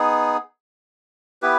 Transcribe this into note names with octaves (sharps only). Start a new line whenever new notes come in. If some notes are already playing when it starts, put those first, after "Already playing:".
Already playing: B3 D#4 G#4
B3 E4 G4 B4